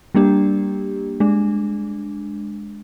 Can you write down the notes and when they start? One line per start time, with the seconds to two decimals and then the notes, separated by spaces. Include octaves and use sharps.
0.15 G3 A#3 D4 G4
1.20 G#3 D4